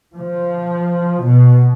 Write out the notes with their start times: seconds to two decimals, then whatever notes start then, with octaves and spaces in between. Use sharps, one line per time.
0.16 F3
1.23 B2